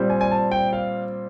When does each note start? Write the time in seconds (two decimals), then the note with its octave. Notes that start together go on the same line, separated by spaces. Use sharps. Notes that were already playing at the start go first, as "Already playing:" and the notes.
Already playing: A#2 G3 C4
0.10 G#5
0.21 G#5
0.31 A5
0.52 G5
0.73 F5